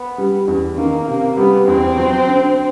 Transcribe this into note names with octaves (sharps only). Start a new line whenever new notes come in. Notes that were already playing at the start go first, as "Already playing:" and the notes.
Already playing: B3
G3
E2
D#3 A#3
C3 A#3
G3 B3
E2 C4
F#3
D3